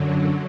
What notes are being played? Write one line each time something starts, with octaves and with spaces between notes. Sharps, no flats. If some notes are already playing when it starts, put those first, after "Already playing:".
Already playing: F#2 D3 F#3